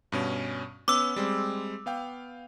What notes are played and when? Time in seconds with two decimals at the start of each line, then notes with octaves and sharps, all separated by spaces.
0.12 G2 B2 C#4
0.88 B3 C#4 D6 E6
1.16 G3 G#3 C4
1.86 B3 F5 G5